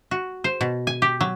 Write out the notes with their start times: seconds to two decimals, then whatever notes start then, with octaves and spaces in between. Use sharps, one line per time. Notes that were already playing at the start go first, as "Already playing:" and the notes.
0.11 F#4
0.44 C5
0.61 B2
0.87 G#5
1.02 G4
1.21 F#3